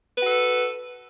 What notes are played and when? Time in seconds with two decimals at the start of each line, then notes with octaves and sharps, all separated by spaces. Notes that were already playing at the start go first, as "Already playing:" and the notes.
0.17 B4
0.22 F#4
0.26 A4